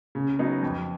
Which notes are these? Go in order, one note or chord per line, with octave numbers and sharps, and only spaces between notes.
C#3
F#3 B3 D#4
F2